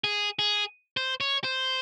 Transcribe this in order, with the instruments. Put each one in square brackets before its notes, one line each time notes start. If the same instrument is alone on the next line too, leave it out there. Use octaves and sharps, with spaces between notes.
[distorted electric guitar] G#4
G#4
C5
C#5
C5